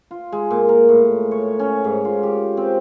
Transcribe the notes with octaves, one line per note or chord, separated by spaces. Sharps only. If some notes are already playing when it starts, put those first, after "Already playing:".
F4
G#3
A#2
A#4
A2
C#5
C#4
G#2
F4
G4
C4